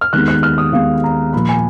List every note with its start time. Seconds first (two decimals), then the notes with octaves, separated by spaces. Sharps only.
0.01 F6
0.13 D#2 D#3 G#3 B3 F#6
0.28 F#6
0.43 F6
0.58 D#6
0.73 D#2 D#3 G#3 B3 F5
1.04 A#5
1.33 A#2 F3 A#3 B5
1.49 G#5